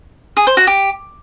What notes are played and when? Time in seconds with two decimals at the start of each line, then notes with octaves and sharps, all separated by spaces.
0.37 G#4
0.47 C5
0.57 F#4
0.67 G4